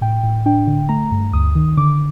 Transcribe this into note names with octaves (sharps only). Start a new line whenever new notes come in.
A2 G5
A2
D4 G5
D3
A3 A#5
G2
D2 D#6
D#3
D3 D6